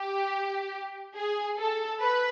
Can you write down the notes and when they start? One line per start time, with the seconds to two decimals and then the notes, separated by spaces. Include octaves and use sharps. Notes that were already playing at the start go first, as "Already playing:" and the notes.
Already playing: G4
1.15 G#4
1.58 A4
2.00 B4